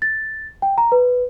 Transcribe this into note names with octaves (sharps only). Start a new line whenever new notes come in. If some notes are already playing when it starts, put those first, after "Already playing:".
A6
G5
A#5
B4